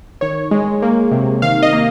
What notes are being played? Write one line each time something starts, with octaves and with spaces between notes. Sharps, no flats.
D#3 C#5
G#3
A#3
C3
D#3 F5
D#5
A#3